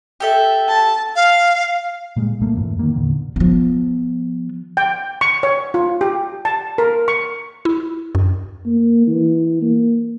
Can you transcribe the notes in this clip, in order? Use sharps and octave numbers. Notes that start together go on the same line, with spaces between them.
G4 A4 E5
A5
F5
A#2 G3 G#3
B1 A#2 A3 A#3
F2 G#2 E3
D#3 F#3 A#3
E2 A#2 D3
F3 B3
G5
C#6
C#5
F4
G4
A5
A#4
C#6
E4
F#2
A#3
E3
A#3